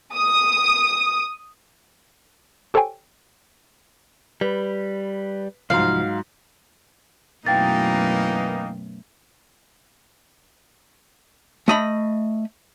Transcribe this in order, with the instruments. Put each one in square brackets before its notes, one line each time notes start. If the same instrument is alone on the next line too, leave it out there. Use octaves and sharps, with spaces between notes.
[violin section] D#6
[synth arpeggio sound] G4 A4 C5 C#5 G5 G#5
[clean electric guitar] G3 [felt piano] B4
[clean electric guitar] C2 F3 [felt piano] G#2 F#3 [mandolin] F5
[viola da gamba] F#2 B2 A3 [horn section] E3 A#3 D#4 [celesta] G5 A6
[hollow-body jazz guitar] A3 D#5 B5